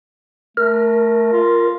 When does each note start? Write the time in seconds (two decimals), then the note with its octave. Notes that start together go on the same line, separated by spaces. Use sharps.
0.57 A3 A#4
1.32 F4